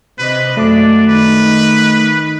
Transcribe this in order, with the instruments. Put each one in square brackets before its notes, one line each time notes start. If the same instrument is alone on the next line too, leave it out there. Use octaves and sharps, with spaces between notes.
[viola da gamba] C3 D#5 [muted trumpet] B4
[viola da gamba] F#2 G#3 D5 [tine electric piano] A3 D6 [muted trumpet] D4
[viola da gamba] D#3 D#4 [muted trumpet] B4